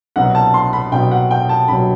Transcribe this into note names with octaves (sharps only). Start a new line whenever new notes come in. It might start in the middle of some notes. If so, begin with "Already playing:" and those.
C2 B2 F#3 F#5
A5
C6
B5
C2 B2 F#3 G5
F#5
G5
A5
C2 B2 F#3 B5